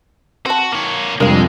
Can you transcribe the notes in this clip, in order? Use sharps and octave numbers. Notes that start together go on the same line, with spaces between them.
C4 F#4 A5
A#3 C#5
F2 C3 G3 G#3 D4 A#4 F5